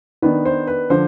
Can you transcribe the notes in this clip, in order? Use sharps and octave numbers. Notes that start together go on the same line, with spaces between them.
D#3 B3 D4 B4
C5
B4
D3 F3 C5